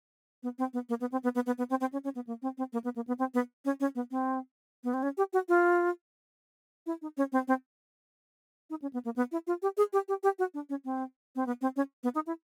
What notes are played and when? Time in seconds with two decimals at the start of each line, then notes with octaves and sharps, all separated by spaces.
0.43 B3
0.58 C4
0.73 B3
0.89 A#3
1.00 B3
1.12 C4
1.23 B3
1.35 B3
1.46 B3
1.58 B3
1.70 C4
1.81 C4
1.92 C#4
2.04 C#4
2.15 B3
2.27 A#3
2.42 C4
2.58 C4
2.73 A#3
2.84 B3
2.96 A#3
3.07 B3
3.19 C4
3.34 B3
3.65 C#4
3.80 C#4
3.95 B3
4.11 C4
4.84 B3
4.94 C4
5.03 C#4
5.17 G4
5.33 F#4
5.49 F4
6.86 E4
7.02 D#4
7.17 C#4
7.32 C4
7.48 C4
8.70 D#4
8.82 C#4
8.93 B3
9.05 A#3
9.16 B3
9.32 E4
9.47 F4
9.62 G4
9.77 G#4
9.93 G4
10.08 G4
10.23 G4
10.39 F#4
10.54 D4
10.69 C#4
10.85 C4
11.36 C4
11.46 B3
11.61 C4
11.76 C#4
12.03 B3
12.15 D#4
12.27 E4